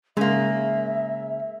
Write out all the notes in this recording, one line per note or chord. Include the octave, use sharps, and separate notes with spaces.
C#3 G#3 A#3 E5